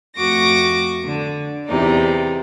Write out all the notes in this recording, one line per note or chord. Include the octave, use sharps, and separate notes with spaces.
F2 A3 F#4 C#6 D6 A#6
D3
E2 C3 D#4 D5